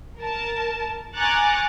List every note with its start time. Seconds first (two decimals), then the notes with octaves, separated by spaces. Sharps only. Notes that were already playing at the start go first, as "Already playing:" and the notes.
0.19 A#4 A5
1.15 G#5 A#5 C#6 D6 F#6 A6